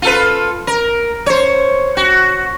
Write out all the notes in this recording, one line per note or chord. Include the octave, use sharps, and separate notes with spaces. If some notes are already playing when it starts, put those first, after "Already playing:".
F4 A4 B4
A#4
C5 C#5
F#4